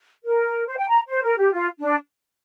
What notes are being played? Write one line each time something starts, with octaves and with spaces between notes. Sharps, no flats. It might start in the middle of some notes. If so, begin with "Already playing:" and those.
A#4
C5
G5
A#5
C5
A#4
G4
F4
D4